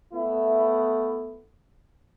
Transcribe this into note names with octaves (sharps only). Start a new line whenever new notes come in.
A3 B3 E4